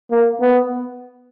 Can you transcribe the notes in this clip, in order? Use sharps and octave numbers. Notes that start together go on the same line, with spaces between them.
A#3
B3